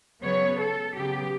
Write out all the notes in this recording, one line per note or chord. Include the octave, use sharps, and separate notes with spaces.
C#3 F#3 B3 C#5
A4
C#3 F#3 B3 G4